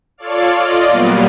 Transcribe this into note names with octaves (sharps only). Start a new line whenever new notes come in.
F4 A4 C#5 D5 F5
F4 D5 D#5
A#2 F#3 G3 A#3 B3